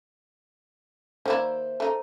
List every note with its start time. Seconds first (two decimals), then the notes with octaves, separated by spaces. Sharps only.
1.26 D#3 A#3 E4 C5 D5 E5
1.80 A3 D#4